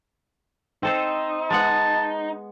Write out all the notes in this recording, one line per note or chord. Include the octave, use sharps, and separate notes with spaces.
C4 D#4 A4 C5
G#3 B3 F#5 A5